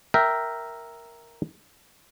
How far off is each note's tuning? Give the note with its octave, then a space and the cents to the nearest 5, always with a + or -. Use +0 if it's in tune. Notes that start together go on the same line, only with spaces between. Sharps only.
A#4 +0 E5 +0 G5 -10